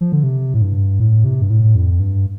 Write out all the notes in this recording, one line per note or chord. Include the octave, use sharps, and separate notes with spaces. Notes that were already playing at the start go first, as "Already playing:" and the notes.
F3
D3
C3
A2
G2
A2
C3
G2
A2
F2
G2